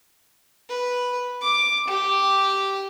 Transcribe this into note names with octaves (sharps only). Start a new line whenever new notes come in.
B4
D6
G4